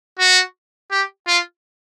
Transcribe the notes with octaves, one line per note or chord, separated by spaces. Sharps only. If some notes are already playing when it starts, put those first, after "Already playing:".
F#4
G4
F4